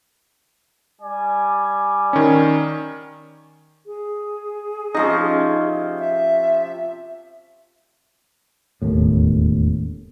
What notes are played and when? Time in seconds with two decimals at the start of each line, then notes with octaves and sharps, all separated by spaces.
1.02 G3 D5 G#5
2.13 D#3 C#4
3.86 G#4
4.95 C3 F3 C#4 D#4 D#5
5.99 E5
8.82 E1 D#2 A2